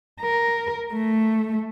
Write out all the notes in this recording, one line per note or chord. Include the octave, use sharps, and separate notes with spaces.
A#4
A3